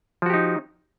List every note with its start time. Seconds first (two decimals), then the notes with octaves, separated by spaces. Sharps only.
0.22 F3
0.26 F#4
0.30 G4
0.34 D#4